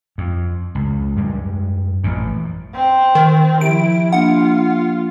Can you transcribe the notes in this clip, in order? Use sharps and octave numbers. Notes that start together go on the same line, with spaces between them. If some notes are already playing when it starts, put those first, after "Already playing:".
F2
C#2
F#2 G3 G#3
A1 F#2 A#2
C4
D#3
F3 E4 G4 D7
A#3 D4 F4 F#5